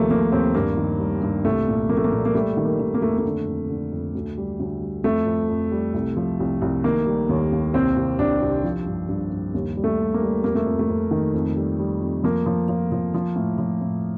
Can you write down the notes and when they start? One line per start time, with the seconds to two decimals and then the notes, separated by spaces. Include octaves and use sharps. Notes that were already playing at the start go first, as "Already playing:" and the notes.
Already playing: D#2 C3 F3 A3 A#3
0.11 F3 A#3
0.32 D#2 C4
0.55 G2 A#3
0.77 D#3
0.99 G3
1.22 G2
1.45 C2 A3
1.68 A#2
1.89 F3 A#3
1.97 A3
2.04 A#3
2.12 A#2
2.25 A#3
2.35 G3 A3
2.57 D#3
2.65 A#3
2.80 D#3
2.94 A#3
3.02 F2 A3
3.18 A3
3.25 D3
3.47 F2
3.69 D3
3.92 F2
4.15 D2
4.38 G3
4.60 D2
4.82 G3
5.04 F2 A3
5.26 F2
5.50 F2
5.72 G3
5.94 C2
6.17 F3
6.40 C2
6.62 C2
6.84 D#3 A#3
7.06 G3
7.29 D#2
7.52 D#2
7.74 C2 C4
7.96 C2
8.19 C2 D4
8.42 C2
8.64 F3
8.86 G2
9.09 G2
9.32 G2
9.54 D#2
9.77 G3
9.84 A3
9.99 G3
10.14 A#3
10.22 G3
10.44 F2 A#3
10.55 A3
10.66 F2
10.79 A3
10.89 F2
11.11 D#3
11.34 F2
11.56 G3
11.79 G3
12.02 F2
12.24 F3 A#3
12.46 F3
12.68 F3
12.92 F3
13.14 F3
13.36 A2
13.58 F3
13.81 A2